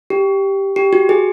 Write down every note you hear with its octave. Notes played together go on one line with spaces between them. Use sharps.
G4
G4
F#4
G#4